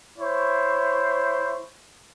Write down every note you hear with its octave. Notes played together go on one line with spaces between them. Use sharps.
E4 C5 C#5